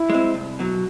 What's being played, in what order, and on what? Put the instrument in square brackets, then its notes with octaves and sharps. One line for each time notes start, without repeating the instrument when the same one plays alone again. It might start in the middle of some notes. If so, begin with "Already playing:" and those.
Already playing: [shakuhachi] E4
[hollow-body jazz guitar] G#3 C4
C2
B2 F#3